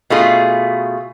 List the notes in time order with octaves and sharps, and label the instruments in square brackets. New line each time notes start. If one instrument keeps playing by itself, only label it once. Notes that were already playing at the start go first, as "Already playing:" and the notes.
[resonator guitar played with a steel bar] B2 A3 F4 G#4